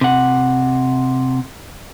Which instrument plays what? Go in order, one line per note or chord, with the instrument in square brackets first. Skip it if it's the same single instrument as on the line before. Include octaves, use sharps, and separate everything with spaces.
[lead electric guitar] C3 F#5